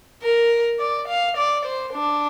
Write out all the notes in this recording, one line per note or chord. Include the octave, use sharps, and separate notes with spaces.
A#4
D5
F5
D5
C5
D4